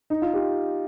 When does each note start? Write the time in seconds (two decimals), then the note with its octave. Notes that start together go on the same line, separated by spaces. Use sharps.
0.10 D#4
0.22 F4
0.34 G4